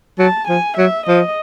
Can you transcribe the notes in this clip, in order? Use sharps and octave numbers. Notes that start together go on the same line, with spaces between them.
F#3 A5
F3 G#5
F#3 E5
F3 D#5